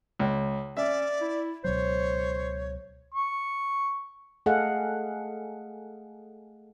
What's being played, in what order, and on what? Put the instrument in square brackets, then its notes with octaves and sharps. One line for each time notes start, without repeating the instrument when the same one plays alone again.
[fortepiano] C#2
[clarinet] C#4 [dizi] D5 [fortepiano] E5
[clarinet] E4
[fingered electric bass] C#2 B2 F#3 [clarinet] C5 [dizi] C#5
[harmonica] C#6
[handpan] A3 G#4 A4 D#5 F5 F#5